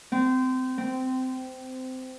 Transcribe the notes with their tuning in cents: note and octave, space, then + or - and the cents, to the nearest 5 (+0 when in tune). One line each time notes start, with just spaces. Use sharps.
C4 -25
C4 -15